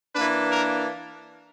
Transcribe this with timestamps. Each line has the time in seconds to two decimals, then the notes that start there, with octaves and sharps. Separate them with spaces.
0.15 E3 A#3 D4 B4
0.51 A#4